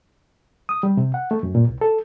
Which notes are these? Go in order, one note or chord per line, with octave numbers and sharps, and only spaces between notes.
D#6
G3
C3
F#5
A3
F#2
A#2
C2
A4